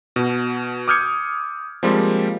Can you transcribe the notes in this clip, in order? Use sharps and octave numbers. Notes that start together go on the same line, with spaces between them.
B2
D6 D#6 F6 G6 G#6 C#7
F3 G3 G#3 A#3 C4